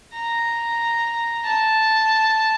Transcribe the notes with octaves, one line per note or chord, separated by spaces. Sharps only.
A#5
A5